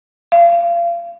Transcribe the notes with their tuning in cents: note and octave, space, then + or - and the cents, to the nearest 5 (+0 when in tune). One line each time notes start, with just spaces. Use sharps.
F5 -30